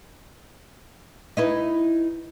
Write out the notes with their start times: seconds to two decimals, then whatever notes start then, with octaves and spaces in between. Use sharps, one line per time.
1.37 D#4 E4 B4